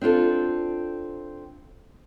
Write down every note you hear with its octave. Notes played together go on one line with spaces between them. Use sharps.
C4 D4 F4 A4